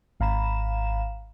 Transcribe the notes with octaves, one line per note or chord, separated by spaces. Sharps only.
G#1 F5 A#5 B5 E7